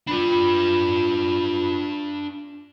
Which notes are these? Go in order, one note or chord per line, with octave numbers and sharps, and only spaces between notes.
D4 F4 B4 B5